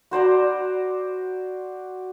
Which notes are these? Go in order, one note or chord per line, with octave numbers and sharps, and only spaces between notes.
F#4 C5 D5 A#5